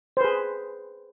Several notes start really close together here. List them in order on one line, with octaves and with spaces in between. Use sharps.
C5 B4 G#4